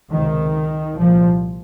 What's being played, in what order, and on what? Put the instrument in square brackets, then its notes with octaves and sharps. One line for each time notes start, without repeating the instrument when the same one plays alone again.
[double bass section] C#2 C3 D#3
C2 A#2 F3